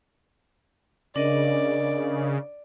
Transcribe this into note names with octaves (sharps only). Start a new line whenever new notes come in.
C#3 D4 A#4 D5 D#5